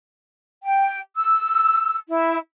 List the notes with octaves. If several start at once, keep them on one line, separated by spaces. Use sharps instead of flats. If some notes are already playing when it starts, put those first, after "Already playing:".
G5
E6
E4